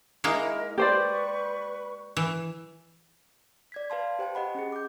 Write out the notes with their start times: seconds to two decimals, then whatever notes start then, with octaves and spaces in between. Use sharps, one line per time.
0.24 G#3 A#3 D#4 E4 A#4 D#5
0.78 G4 B4 C5 D5 C#6
2.17 E3
3.72 D5 G#6 B6
3.90 B4 F5 A5 C6
4.19 G4 C5 G5 A5
4.35 G4 D#5 F#5 B5
4.55 C#4 G#4
4.72 D6 G6